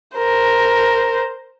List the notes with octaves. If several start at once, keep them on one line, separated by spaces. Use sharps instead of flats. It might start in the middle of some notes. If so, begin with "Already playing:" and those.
A#4 C5